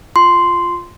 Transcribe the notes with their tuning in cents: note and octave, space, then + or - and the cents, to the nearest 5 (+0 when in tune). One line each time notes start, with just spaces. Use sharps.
F4 +0 C6 -5